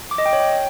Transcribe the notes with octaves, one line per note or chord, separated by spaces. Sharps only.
D6
D#5
G5
C#5
G5